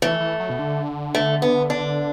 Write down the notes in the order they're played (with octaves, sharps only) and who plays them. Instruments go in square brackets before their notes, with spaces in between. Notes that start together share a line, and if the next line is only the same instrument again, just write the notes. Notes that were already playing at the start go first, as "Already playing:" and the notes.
[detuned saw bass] E3 [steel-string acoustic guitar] A3
[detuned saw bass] E3
F#3
B2
D3
[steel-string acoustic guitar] A3
B3
D4